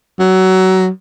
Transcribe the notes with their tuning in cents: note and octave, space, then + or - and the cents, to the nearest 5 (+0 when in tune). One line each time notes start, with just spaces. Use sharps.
F#3 +20